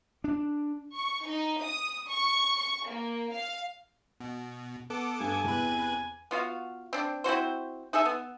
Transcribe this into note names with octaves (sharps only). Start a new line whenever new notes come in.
D4
C#6
D#4
D#6
C#6
C#6
A#3
F5
B2
B3 A4 D6
G2 G#5
E2 C3 B4
B3 F4 F#4 F5
C4 D4
C4 E4 F#4 C5
D#4 G#4 A4 E5
B3